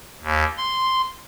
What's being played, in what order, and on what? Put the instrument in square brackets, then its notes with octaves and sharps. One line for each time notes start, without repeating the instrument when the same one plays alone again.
[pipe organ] D#2
C6